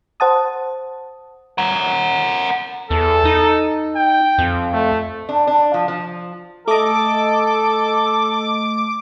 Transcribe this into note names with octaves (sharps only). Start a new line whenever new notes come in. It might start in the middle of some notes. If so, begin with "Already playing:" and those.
C5 F#5 A5 D#6
A#4 F#5
E2 A4
D#4
G5
F2
A3
D4
D4
F3
F3
A3 A4 D#5 D6